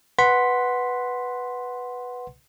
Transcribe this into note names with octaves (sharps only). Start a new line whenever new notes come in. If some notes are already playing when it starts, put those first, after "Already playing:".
B4 F#5 C6 B6